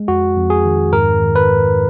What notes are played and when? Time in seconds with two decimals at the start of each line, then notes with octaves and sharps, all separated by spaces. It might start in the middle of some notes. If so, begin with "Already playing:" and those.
Already playing: G#3
0.08 F2 F#4
0.37 F2
0.50 G#4
0.65 D#3
0.93 G#2 A#4
1.22 D#3
1.36 B4
1.49 G#2